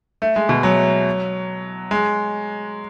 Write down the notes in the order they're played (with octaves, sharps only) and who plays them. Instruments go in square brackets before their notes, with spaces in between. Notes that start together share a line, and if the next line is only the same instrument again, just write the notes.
[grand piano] A3
G#3
B2
F#3
G#3